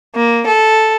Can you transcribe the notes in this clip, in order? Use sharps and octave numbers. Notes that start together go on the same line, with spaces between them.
A#3
A4